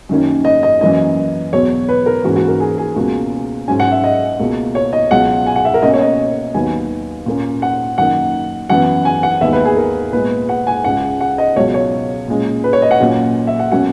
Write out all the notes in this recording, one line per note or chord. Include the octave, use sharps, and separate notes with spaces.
F#2 D#3 A#3 C#4
D#5
D#5
F#2 E3 A#3 D#5
E2 B2 F#3 C#5
B4
A#4
G#2 E3 A#3 C#4 F#4
F#4
A#4
G#4
G#4
C#2 B2 A#3 C#4 F#4
G#2 F#3 C#4 G#5
F#5
E5
D#5
C#2 B2 A#3
C#5
D#5
C#2 B2 F#3 F#5
G#5
F#5
E5
A#4
B2 A#3 C#4 D#5
C#5
D#5
D#2 D#3 F#3 B3 G#5
A#2 A#3 C#4
F#5
F#2 D#3 A#3 F#5
F#2 E3 B3 F#5
G#5
F#5
D#2 D#3 G#3 B3 E5
B4
G#4
A#4
A#2 G#3 B3 B4
F#5
G#5
C#2 C#3 G#3 F#5
F#5
D#5
C#2 B2 F#3 C#5
C#5
A#2 G#3 C#4
B4
C#5
D#5
F#5
A#2 F#3 C#4
E5
F#5
B2 F#3 A#3 C#4 F#5